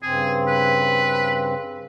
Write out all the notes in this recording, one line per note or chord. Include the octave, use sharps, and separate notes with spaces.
G2 C#3 C4 G#4
B4